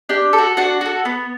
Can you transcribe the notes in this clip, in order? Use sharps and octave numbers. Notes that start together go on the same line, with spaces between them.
D4 G4 G5
A4
F#4
D4 F#4 F#5
F#4 A4
B3